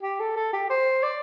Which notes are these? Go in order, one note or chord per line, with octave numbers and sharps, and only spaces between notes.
G4
A4
A4
G4
C5
D5